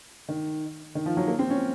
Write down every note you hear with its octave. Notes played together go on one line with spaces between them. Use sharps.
D#3
D#3
F3
F#3
A#3
C4
C#4